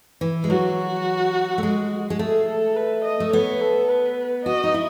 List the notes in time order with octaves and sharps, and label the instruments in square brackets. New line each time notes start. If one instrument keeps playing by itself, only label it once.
[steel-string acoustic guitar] E3
G#3
[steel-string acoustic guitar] F#3 [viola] F#4
[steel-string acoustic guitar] A3
G#3
G#3
[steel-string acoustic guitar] A3 [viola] G#4
[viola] A4
B4
D#5
[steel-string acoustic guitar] A3
[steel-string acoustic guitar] B3 [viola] C#5
[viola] A4
B4
[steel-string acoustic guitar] F#4 [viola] D#5
[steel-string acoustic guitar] D#4
E4